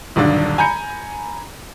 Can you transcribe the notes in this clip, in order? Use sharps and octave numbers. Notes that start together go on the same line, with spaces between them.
D#1 B1 G2 D3 D5
G#5 A#5 B5 G6 C#7